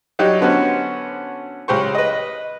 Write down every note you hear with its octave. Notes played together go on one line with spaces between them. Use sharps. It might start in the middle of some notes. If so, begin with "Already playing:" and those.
F#3 G3 D#4 G4
D3 B3 C#4 F#4 C5
C#2 G4 C5 C#6
B4 D#5